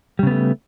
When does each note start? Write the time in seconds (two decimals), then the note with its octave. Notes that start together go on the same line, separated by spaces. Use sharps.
0.19 G3
0.23 C#3
0.27 B3
0.31 A3